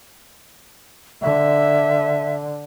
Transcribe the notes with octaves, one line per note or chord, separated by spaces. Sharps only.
D3 E5